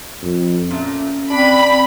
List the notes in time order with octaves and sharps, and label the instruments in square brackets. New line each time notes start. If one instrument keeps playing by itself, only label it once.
[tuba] F2
[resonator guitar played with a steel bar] A#2 A3 [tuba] C#4
[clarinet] C4 [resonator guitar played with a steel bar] D4 [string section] B5